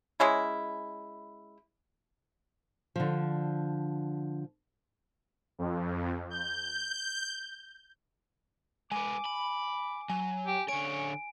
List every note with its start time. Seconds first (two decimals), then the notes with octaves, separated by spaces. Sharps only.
0.20 G#3 C#4 E4
2.96 D3 F3
5.59 F2
6.30 G6
8.91 G#3 B3 G#5 D6
9.25 B5
10.09 F#3 G#5
10.47 G4
10.69 D3 C#4 C#5 D7